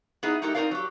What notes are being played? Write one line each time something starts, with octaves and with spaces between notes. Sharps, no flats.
B3 D#4 E4 G#4
G#3 D#4 E4 G4 A4 A#4
C4 D#4 F#4 A#4 D5 F5
F#3 G4